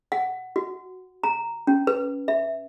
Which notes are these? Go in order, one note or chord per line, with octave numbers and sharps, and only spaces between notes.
F#5
F#4
A#5
C#4
B4
E5